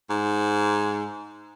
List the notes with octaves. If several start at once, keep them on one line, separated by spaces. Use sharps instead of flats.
G#2